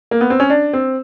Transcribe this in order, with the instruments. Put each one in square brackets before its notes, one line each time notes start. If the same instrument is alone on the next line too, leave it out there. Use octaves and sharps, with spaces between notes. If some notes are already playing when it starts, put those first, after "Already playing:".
[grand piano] A#3
B3
C4
C#4
D4
C4